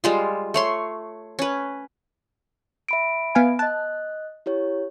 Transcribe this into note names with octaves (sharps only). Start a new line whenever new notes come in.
G3 G#3 F4
A3 C#5 C6
C#4 B4
E5 B5 D7
B3 F5 G#5
D#5 A5 F#6
E4 G4 C#5